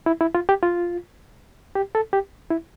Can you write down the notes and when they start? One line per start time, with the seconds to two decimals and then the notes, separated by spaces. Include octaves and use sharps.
0.06 E4
0.21 E4
0.35 F4
0.49 G4
0.63 F4
1.75 G4
1.95 A4
2.13 G4
2.51 E4